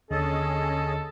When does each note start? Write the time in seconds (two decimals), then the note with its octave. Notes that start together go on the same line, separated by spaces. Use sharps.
0.11 D#2 D3 C#4 G#4 A4 D#5